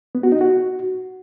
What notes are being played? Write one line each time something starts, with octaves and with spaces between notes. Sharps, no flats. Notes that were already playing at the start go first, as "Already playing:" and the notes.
B3
F#4
D#4
F#4